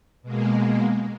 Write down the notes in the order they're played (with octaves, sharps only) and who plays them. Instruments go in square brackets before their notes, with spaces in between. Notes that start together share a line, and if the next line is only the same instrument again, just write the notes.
[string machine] B2 G#3 A#3